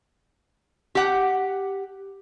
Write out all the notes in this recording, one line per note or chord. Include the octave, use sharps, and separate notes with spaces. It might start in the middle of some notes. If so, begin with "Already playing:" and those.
G4 F#5